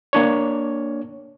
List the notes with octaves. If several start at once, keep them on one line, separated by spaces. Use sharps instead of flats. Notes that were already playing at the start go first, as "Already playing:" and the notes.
A#3 D4 C#5